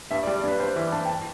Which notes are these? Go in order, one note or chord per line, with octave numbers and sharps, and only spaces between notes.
G2 E5
D5
G3
D5
G2 B4
G2 C5
E3 E5
G2 A5
G5
A5